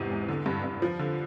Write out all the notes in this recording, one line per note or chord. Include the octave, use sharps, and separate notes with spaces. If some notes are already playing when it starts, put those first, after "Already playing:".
Already playing: E2 G#2 C3
E2
D3
G2
G2
F3
D3